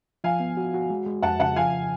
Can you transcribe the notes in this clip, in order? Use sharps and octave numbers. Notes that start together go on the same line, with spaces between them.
F3 F5 G#5
B3
F#4
F#4
G#3
G#3
F2 F#5 A5
C#3 F#5 A5
F3 F5 G#5